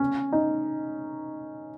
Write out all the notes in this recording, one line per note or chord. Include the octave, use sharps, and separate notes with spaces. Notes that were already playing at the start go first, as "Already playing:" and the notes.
Already playing: C#4
D#4